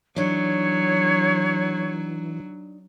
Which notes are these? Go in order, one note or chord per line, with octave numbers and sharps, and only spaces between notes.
E3 F#3 D4 D#4 C#5